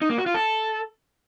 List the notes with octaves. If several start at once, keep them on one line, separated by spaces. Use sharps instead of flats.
D#4
A#3
F#4
F4
A4